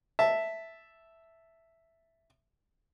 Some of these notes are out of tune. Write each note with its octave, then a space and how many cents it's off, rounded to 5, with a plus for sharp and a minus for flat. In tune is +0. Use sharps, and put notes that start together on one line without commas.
E5 +0 A5 +0